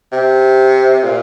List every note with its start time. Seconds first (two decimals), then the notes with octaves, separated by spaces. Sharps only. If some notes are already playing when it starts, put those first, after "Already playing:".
0.12 C3
1.04 A#2